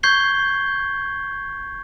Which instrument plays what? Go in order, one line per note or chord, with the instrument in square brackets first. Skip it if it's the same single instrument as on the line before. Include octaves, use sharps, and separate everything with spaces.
[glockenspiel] C#6 G6 G#6 C7 G7